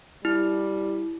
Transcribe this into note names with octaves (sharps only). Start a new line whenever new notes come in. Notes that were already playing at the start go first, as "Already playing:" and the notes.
G3 E4